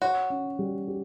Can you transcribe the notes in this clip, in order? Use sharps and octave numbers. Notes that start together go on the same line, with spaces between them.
F#4 C#5
C#4
G3
G4